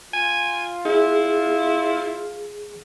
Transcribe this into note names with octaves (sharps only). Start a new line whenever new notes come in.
F4 G#5
E4 G#4